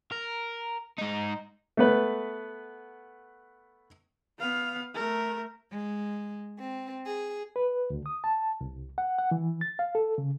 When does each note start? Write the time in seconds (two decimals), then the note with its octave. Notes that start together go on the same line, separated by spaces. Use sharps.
0.12 A#4
0.99 G#2 D#4
1.77 A3 B3 B4
4.39 B3 F5
4.95 A3 A#4
5.73 G#3
6.58 C4
7.06 G#4
7.56 B4
7.90 D2
8.06 D#6
8.24 A5
8.61 C2
8.98 F#5
9.19 F#5
9.31 E3
9.61 A6
9.79 F5
9.95 A4
10.18 C#3